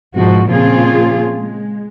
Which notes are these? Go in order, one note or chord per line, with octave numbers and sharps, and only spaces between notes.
G#2 B2 F3 F#4
A#2 C#3 F3 C4 F4 G#4
G#3